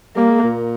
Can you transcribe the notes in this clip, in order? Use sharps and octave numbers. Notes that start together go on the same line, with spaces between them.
G3 A#3
G#3
A#2